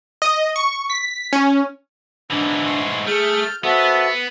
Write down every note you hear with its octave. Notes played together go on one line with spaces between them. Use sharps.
D#5
C#6
B6
C#4
G#2 E3 D4
C6 C#6
A3 G#4 F6 G6
B3 F#4 A4 C5 E5